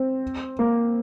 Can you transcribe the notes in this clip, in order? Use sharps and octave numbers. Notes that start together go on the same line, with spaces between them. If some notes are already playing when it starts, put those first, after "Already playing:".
Already playing: C4
A#3